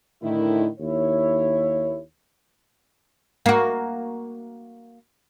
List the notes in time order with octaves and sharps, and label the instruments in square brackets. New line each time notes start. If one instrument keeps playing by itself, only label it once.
[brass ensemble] A2 D3 D#3 E4
D#2 E4 C#5
[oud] A#3 F#4